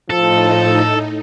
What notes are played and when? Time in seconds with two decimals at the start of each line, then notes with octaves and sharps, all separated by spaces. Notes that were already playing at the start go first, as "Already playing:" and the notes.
0.10 A2 F3 A3 D#4 A4